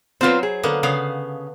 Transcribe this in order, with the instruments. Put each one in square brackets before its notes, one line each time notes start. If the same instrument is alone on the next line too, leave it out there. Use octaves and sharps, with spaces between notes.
[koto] F#3 C5 [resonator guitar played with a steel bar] C4 F4 B4
[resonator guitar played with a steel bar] G#4
[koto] D3 A#3 B3
[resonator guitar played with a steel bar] C#3 [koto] B3 F5